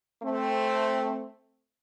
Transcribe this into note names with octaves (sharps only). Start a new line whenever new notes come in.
A3 C4